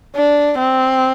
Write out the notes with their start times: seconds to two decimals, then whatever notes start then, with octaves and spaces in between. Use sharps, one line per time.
0.16 D4
0.58 C4